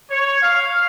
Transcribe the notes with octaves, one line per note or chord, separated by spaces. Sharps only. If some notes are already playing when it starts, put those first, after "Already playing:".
C#5
F5